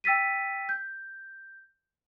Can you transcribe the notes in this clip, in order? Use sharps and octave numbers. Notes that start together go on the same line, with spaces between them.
G5 E6 A6 B6 D#7
G6